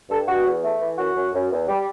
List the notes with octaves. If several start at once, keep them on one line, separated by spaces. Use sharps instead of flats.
G2 A4
G2 F#4
E2
A3
E3
F#2 F#4
F#2
F#2
E2
G3